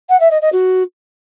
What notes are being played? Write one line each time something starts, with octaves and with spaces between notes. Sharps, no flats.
F#5
E5
D#5
D#5
F#4